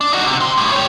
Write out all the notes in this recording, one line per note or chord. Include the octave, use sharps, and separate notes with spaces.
D4
D#4 F#4
C3
G2 C6
A2 G3
G4 C#5